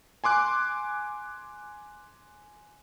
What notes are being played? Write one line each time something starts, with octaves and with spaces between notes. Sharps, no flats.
G#5 C6 D6 F#6